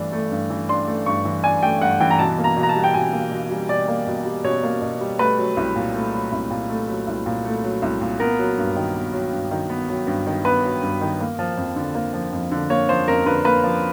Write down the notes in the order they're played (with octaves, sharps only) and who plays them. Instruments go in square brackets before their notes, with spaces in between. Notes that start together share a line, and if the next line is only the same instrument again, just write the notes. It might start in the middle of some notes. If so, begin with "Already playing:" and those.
Already playing: [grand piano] G2 E3 A3 D4
A3
G2
E3
D4 C6
A3
G2 C#6
E3
D4 G#5
A3 G5
G2 F#5
E3 G5
A#5
B2 A5
A#3
A#5
B2
A#5
A5
G3
G5
B2 G#5
A#3
B2
G3
B2 D5
A#3
B2
G3
B2 C#5
A#3
B2
G3
A3 B4
F#3
C2
A#2
A3
F#3
C2
A#2
A3
F#3
C2
A#2
A3
F#3
C2
A#2
B3 A#4
F#3
G2
D#3
B3
F#3
G2
D#3
B3
F#3
G2
D#3
B3 B4
F#3
G2
D#3
A#3
F3
F2
D3
A#3
F3
F2
D3
A#3 C#5
F3 C5
F2 A#4
D3 B4
A#3 B4
F3